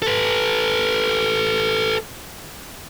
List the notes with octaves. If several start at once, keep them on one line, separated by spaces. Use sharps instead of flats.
A4 B4